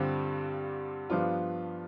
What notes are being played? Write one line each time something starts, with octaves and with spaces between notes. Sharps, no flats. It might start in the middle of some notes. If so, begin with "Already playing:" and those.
Already playing: G2 D3 G3 C4 F4
G2 F3 B3 D4 F4